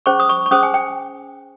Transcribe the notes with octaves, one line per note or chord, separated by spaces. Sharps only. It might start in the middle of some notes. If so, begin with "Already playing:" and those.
C#4 G#4 C5 C#6
D#6
C#6
C#6
C#4 G#4 C5 D#6
G#5
G5